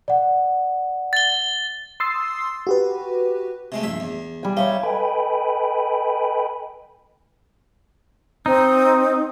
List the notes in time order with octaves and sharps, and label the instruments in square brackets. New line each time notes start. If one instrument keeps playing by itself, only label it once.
[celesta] D5 F#5
[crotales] A6 G7
[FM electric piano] C6 D#6 E6 A6 C7
F#4 G4 B4
[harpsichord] C3 G#3 A3
A#1 G2 E5
E2
[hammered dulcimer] G3 G#5
[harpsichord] D#4 [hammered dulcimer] C#5 E5 F5
[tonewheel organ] A4 B4 D#5 G5 G#5 B5
[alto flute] C4 [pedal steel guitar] D#4